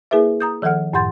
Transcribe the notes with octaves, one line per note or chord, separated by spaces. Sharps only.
A#3 E4 G#4 A#4 B4 E5
A#5 D#6 G6
D#3 F3 A4 F#5 F6
F#2 A2 F#5 C6 G6 A6